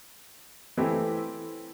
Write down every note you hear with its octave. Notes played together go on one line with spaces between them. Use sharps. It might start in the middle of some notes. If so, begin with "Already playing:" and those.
E3 A3 C4 E4 G4